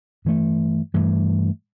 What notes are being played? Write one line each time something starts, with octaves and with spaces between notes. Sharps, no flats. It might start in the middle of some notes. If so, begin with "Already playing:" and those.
G2 E3 A3
G2 E3 A3